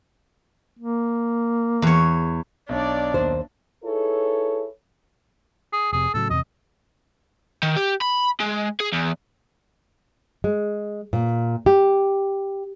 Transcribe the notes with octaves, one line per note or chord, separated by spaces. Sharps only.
A#3
E2 C#5
B1 D4 C#5 D5
D#2 C5
D#4 E4 G#4 A4 B4 C#5
G#4
F1 C3 G#4
A2 C#3 F#3 A4
E2 C3 D#5
D#3
G4
B5
G#3
G#4
E2
G#3
A#2
G4